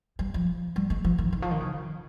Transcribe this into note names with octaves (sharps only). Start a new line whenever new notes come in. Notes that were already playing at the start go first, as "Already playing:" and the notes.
G3
F3
G3
G#3
F3
D#3
D#3
F3
D#3
C#3